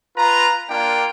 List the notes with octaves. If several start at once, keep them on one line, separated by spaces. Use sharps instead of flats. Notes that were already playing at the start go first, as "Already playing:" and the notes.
F4 B4 A#5
A#3 D4 F4 G5